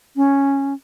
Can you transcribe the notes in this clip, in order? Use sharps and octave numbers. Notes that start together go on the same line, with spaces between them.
C#4